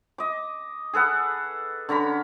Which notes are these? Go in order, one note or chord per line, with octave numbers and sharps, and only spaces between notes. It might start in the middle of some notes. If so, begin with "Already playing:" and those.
D#5 D6
G#4 A4 B4 F#5
D3 C#4 A#5 B5